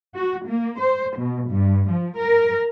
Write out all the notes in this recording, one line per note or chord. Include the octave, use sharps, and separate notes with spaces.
F#4
A#3
C5
B2
G2
F3
A#4